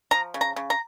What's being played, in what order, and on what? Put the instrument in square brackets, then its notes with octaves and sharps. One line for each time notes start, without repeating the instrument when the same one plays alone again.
[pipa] F3 A#5
C#3
A#5
C#3
A#5